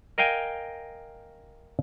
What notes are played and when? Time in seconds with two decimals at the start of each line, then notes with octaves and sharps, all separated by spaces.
0.18 A#4 D#5 F5 G5 G#5